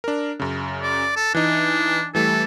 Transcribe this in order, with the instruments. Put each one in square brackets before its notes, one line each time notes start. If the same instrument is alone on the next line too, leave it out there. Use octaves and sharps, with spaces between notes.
[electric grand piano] D4 A#4
F#2 C#3
[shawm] D5
A4
[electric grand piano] E3 D#4 [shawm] D4
[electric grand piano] E3 G3 A3 [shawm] A4